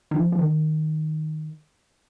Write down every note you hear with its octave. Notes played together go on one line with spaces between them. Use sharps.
D#3
F3
F3
D#3